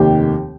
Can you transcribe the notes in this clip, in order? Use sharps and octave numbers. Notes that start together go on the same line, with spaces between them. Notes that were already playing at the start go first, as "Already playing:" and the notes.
Already playing: F1 D#2 D#3 G4